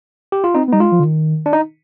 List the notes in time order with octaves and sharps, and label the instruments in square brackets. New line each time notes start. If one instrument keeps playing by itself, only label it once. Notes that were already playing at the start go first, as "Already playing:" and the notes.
[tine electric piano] G4
F4
[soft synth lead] C4 [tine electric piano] D#4
[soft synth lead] B3
[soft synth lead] G3 [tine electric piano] D#4
[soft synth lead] G#3 [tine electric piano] F4
[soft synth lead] F3
D3
D#3
[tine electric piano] D4
D#4